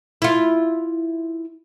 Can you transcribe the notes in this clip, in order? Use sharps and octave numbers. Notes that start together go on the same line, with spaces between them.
E4 F4